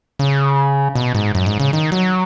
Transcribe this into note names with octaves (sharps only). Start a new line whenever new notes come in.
C#3
B2
G#2
F#2
G#2
C#3
D#3
F#3